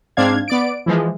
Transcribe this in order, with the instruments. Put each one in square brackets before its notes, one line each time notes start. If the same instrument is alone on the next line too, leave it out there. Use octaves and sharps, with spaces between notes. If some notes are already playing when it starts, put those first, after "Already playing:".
[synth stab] G#2 C4 D4 F5 G#6
B3 D5 D7
E3 F3 G#3